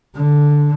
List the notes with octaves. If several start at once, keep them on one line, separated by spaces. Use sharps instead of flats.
D3